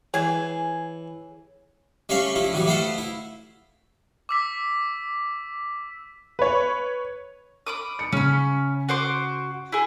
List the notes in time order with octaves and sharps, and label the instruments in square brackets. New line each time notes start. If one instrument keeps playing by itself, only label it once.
[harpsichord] E3 [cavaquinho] G#4 G#5 [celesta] C#5
[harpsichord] G3 A3 C#4 C#5 F5
F3 A3 E4
A2 E3 F#3 G3
A3 B3 A4 C5 F5
E4
[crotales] D6 E6 B6
[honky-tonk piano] B4 C#5
[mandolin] B5 D6 D#6
[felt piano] C#7
[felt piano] C#3 [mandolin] C#4 B5
[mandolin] F#4 C5 D6
E4 G#4